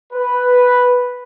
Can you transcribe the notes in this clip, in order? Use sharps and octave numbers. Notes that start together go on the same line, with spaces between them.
B4